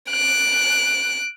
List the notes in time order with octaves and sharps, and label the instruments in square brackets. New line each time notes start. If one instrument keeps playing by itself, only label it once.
[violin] F#6 D7